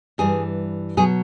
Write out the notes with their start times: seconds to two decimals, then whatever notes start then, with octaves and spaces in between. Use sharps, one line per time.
0.18 G2 E3 G3 G#4
0.97 B2 F#3 G#4